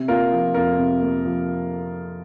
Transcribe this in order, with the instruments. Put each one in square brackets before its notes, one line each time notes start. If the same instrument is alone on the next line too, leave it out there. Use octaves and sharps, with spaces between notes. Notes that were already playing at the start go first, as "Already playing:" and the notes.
Already playing: [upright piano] C3
A#3 F4 A#4
F3
F2 F4 A#4
C3
A#3
F3